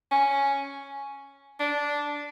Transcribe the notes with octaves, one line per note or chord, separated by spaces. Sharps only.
C#4
D4